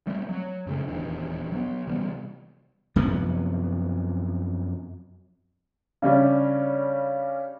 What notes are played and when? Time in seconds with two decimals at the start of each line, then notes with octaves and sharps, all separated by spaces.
0.07 G3 A3 C4
0.29 F#3
0.66 F#2 C#3 A3
0.88 D#1 E2 D#3 D4
1.52 F#3 B3
1.87 C3 E3 G3 B3
2.96 F#2 C3 F3 B3
6.02 C#3 G3 C#4 D4